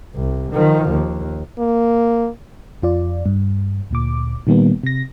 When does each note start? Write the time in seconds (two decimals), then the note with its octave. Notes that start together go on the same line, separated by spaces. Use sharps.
0.15 C2
0.52 D#3 F3
0.90 D#2
1.59 A#3
2.82 F2 F4 D5
3.26 G2
3.90 D2 A#2 D6
4.47 A#2 D#3 G3 A#3 B3
4.83 C3 A#6